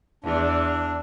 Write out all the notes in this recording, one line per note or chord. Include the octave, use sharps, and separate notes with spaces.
E2 D4